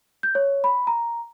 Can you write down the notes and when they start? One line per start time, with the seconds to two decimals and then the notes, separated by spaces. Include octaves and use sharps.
0.23 G6
0.35 C#5
0.64 B5
0.87 A#5